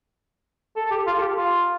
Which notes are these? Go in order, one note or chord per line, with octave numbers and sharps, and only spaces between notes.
A4
A4
G4
F4
A4
G4
F4